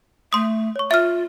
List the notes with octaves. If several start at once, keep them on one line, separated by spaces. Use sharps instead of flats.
A3 C6 D#6
C#5 C#6
F4 E5 F6